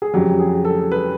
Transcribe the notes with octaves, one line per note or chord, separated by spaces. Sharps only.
G#4
F2 C#3 F#3 G4
G#4
A4
B4